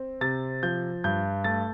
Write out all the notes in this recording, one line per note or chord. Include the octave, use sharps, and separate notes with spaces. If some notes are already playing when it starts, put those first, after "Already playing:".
Already playing: C4
C3 A6
F3 G6
G2 G6
A3 A6